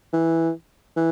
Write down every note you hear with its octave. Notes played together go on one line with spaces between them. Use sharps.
E3
E3